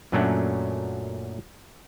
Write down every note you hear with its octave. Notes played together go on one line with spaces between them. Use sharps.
F#2 A#2 F#3 A3 C#4 D4